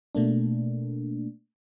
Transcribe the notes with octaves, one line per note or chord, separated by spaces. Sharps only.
B2 A3 A#3 D4